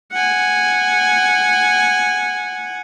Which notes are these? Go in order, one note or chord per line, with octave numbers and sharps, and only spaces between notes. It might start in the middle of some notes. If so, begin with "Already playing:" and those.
F#5 G#5